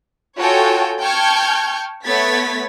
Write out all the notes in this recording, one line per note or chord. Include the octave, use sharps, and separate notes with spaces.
F4 F#4 A4 C#5 G5 G#5
G5 A5 C#6 F6 G6 G#6
A3 B3 C#5 G#6 A6 B6